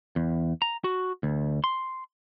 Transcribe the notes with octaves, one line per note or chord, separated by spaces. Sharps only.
E2
A#5
F#4
D2
C6